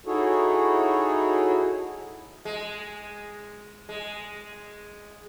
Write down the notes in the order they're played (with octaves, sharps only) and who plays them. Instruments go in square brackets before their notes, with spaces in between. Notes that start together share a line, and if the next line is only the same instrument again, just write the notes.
[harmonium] D#4 E4 F#4 G#4 A4 C#5
[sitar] G#3
G#3